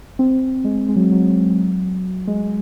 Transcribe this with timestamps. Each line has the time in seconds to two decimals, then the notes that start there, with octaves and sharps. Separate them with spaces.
0.19 C4
0.64 G#3
0.89 G#3
0.96 F#3
1.12 F#3
2.27 G#3